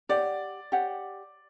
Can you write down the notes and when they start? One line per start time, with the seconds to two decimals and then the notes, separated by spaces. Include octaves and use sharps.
0.09 G4 C#5 D5 F#5
0.72 G4 C#5 F#5